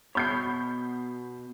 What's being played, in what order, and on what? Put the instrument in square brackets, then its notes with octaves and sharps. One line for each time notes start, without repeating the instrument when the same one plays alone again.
[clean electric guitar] B2 C#5 [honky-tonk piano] B5 G6 C7